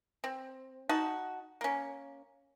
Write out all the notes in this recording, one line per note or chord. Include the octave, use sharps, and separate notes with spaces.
C4
D#4 F#4 A5
A#3 C#4